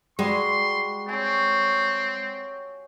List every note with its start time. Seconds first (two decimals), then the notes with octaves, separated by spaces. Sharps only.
0.19 G3 G#3 F#4 C6
1.09 C4 C#5 G#5